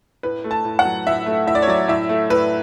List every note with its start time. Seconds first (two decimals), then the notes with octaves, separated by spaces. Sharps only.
0.23 A2 B4
0.44 A3
0.51 A5
0.65 A2
0.79 F#5
0.85 F#3
1.07 A2 E5
1.26 A3
1.47 A2 E5
1.55 D5
1.62 C#5
1.67 F#3 D5
1.88 A2 E5
2.09 A3
2.30 A2 B4